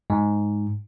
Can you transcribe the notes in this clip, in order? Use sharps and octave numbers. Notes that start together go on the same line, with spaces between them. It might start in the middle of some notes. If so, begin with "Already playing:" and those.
G#2